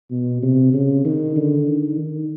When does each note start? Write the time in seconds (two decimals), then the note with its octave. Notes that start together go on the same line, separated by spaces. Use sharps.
0.11 B2
0.43 C3
0.73 C#3
1.05 D#3
1.36 D3
1.67 D#3
1.98 D#3